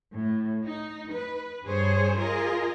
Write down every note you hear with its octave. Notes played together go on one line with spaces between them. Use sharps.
A2
D#4
B4
G2 G#4 C5 C#5
F4 G#4 A#4 D#5